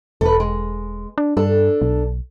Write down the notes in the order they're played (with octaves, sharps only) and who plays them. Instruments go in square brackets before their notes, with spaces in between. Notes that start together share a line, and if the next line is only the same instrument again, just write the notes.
[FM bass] E1 [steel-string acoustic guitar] A4 B4
[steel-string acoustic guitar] G#3
[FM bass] D4
[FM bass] G2 [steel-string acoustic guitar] D4 A4
[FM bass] B1